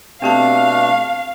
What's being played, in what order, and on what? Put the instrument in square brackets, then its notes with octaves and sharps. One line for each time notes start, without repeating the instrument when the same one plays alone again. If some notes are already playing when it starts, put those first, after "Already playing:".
[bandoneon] B2 A3 D4 [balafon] C4 G4 A5 [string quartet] F5